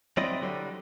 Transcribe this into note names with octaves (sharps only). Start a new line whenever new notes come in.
F#3 C4 E4 D5 D#5
D3 F#3 G3